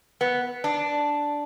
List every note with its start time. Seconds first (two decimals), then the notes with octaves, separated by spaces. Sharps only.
0.21 B3
0.64 D4